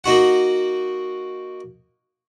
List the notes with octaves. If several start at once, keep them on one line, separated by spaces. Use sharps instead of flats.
A#3 D#4 F#4 F#5